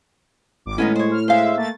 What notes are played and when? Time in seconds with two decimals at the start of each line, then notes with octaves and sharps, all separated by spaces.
0.66 G#1 D6
0.78 A2 D#3 G#3 B3 C#4
0.96 C5 C#5
1.11 F6
1.28 G#3 C5 E5 F5
1.56 A3 A#3 A6